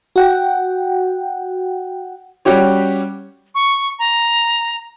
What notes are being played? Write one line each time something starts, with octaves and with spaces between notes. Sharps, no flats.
F#4 F#5 G5
G3 C#4 F#4 G4 C#5
C#6
A#5